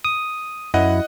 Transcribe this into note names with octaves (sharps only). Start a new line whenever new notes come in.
D#6
F#2 E4 D#5 F#5